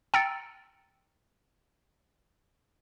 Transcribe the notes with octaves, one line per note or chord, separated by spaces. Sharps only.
G5 A#5 E6 A6 C#7 D7